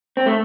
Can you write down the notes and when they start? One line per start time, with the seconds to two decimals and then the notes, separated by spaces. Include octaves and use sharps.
0.17 C4
0.26 A3